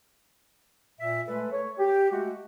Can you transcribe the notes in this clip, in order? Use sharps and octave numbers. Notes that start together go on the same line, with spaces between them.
A#2 E5
G#3 A3 A4 B4
C#5
G4
G#3 A3 F#4